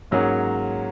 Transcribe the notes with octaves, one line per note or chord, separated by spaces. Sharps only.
G#2 F#3 A#3 C#4 G#4